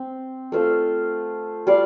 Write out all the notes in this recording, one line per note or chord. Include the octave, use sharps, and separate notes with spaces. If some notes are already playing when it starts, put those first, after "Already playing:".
Already playing: C4
A3 F4 A4 C5
G3 F4 D5 F5